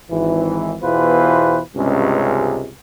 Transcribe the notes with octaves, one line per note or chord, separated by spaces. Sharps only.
G#1 E3
E2 B2 E3 F4 B4 C5
C#2 G2 C3 G#3 C#4